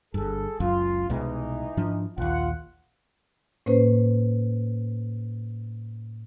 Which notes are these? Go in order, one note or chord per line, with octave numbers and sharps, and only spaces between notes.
G1 G2 G#4 A4
F#1 C#2 F#2 F4
C2 B2 E3 G#3 D#4
G#2 F3 D4
A#1 D#2 F4 F#5
A2 A#3 C#4 B4 C5